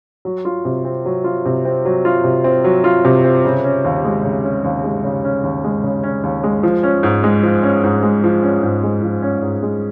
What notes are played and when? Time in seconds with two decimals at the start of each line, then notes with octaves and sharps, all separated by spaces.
0.25 F#3
0.45 F4
0.65 C3
0.85 C4
1.05 F#3
1.24 F4
1.45 C3
1.65 C4
1.85 F#3
2.05 F4
2.24 C3
2.44 C4
2.64 F#3
2.84 F4
3.05 C3
3.24 C4
3.44 C#3
3.64 C#4
3.84 D#2
4.04 G#3
4.24 C#3
4.44 C#4
4.64 D#2
4.84 G#3
5.04 C#3
5.24 C#4
5.43 D#2
5.64 G#3
5.84 C#3
6.03 C#4
6.23 D#2
6.44 G#3
6.63 F3
6.83 C#4
7.03 G#2
7.23 G#3
7.43 F3
7.63 C#4
7.84 G#2
8.03 G#3
8.24 F3
8.43 C#4
8.63 G#2
8.83 G#3
9.03 F3
9.22 C#4
9.42 G#2
9.63 G#3